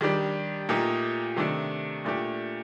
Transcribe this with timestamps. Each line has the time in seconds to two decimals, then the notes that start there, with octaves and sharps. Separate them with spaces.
0.01 D#3 G3 D4 G4
0.69 A#2 A3 D#4 G4
1.36 C3 D#3 A3 D4
2.05 A#2 A3 D4 G4